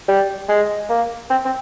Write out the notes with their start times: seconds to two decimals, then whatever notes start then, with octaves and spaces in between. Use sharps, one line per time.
0.08 G3
0.49 G#3
0.89 A#3
1.30 C4
1.45 C4